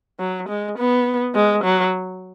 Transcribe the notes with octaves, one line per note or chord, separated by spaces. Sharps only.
F#3
G#3
B3
G#3
F#3